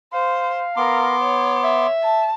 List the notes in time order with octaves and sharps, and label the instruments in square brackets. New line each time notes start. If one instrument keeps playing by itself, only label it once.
[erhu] C5 [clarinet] F5
[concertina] B3 C6 D6 [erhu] A#4
[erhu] C#5
[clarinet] E5
[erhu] A5